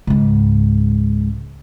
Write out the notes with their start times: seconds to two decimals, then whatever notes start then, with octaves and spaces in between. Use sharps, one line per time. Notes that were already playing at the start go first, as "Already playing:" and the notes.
0.07 C#2 G#2